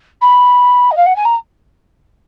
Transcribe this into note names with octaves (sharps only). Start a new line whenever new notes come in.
B5
D#5
F5
F#5
G#5
A#5